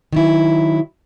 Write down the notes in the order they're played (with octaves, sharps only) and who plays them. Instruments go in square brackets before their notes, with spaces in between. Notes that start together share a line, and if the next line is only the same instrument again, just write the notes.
[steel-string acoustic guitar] D#3 F#3 E4